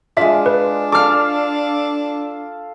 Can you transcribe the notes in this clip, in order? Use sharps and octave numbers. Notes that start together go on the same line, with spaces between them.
G#3 D4 F4 E5
B4
A4 F5 D6 F6